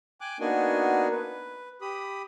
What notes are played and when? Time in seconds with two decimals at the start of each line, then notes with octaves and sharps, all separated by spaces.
0.21 G5 G#5 D6 F#6
0.40 A#3 B3 D4 D#4 F#4 G#5
1.11 B4
1.81 G4 B5 D#6